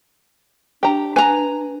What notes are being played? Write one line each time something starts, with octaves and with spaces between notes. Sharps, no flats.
D4 G4 A#5
B4 G#5 A#5